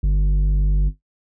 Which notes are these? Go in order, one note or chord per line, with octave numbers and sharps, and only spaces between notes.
G1